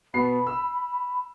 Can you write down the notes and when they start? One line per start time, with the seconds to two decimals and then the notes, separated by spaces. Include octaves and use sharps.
0.14 B2 B3 B5 C7
0.47 E6